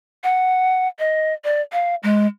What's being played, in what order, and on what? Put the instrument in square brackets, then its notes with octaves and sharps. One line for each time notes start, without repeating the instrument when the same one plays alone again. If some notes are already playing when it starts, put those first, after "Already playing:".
[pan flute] F#5
D#5
D5
F5
G#3